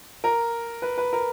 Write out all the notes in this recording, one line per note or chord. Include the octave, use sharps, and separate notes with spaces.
A#4
B4
B4
A#4